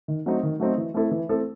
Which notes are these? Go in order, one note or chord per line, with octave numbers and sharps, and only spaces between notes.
D#3
F#3 A3 C4 D#4
D#3
F#3 A3 C4 D#4
E3
A3 C4 E4 A4
E3
A3 C4 E4 A4